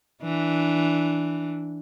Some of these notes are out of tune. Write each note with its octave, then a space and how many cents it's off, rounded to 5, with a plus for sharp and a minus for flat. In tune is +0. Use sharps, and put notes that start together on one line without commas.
E3 -5 D4 +0